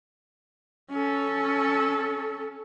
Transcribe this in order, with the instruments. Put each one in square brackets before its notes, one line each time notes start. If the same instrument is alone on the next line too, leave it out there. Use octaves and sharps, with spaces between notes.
[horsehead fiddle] C#4 A4